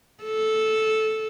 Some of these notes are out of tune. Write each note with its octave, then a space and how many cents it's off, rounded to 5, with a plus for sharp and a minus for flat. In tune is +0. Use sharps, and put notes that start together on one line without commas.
A4 -10